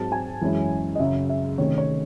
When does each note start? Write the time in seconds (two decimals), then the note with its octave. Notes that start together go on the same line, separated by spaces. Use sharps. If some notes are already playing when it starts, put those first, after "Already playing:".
Already playing: G#2 F#3 C4 A5
0.12 G#5
0.41 F#2 E3 G#3 C#4 E4
0.95 D#5
0.99 F#2 C#3 F#3 E5
1.29 E5
1.58 C3 D#3 A3 C#4 C#5
1.78 C#5